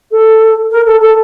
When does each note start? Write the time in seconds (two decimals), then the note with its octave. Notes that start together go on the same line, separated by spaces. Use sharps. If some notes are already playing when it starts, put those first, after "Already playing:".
0.11 A4
0.71 A#4
0.86 A4
1.01 A4